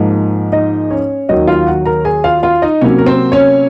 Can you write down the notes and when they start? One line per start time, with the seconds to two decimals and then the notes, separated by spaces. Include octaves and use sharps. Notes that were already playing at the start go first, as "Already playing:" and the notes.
Already playing: G#2 F3 A#3 D#4
0.52 D#4 D#5
0.91 C#4 C#5
1.29 D#2 D#3 F#3 D#4 D#5
1.47 F4 F5
1.67 F#4 F#5
1.86 A#4 A#5
2.05 G#4 G#5
2.24 F4 F5
2.43 F4 F5
2.62 D#4 D#5
2.81 C3 F#3 A#3 C#4 C#5
2.99 A#4
3.07 C4 C5
3.32 C#4 C#5